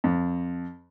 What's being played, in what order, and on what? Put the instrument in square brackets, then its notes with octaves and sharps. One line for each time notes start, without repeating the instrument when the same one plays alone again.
[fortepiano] F2